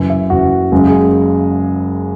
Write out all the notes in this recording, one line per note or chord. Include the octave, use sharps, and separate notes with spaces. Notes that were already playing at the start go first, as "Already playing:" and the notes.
Already playing: F#1 F#2 E3
E5
F#1 F#2 E3 F#4
F#1 F#2 C#3 G#3
G#4